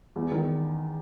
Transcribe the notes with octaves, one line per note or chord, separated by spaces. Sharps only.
E2
D#3